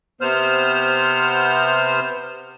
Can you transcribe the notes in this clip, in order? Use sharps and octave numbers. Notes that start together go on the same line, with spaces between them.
C3 B3 C5 F6